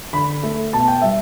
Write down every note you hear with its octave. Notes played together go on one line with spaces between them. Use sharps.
D3 B5
A3 A4
B2 A5
G5
G3 E5